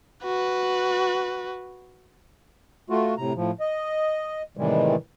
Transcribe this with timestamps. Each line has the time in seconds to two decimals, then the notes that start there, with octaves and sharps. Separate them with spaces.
0.24 F#4 B4
2.90 A3 F4 F#4
3.18 A2 C3 A#5
3.35 A2 F3
3.60 D#5
4.57 A2 C3 D#3 E3 G3 G#3